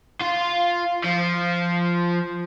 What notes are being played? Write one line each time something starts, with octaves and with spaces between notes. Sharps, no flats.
F4
F3